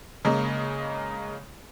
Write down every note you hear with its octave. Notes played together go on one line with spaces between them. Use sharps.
C#3 G#3 A#3